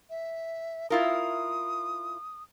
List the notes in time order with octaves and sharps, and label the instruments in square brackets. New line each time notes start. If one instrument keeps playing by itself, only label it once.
[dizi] E5
[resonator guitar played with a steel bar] E4 F4 A#4 [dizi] D#6